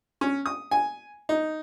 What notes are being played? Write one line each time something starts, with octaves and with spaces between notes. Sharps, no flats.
C#4
D#6
G#5
D#4